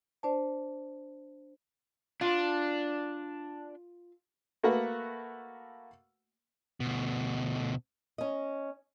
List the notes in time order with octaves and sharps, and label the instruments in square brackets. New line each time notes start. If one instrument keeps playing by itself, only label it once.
[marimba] D4 C5 D5 A5
[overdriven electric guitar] D4 [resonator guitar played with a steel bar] F4
[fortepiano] A3 A#3 F#4 B4 F#5
[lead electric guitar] D2 B2
[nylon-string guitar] C#4 D#5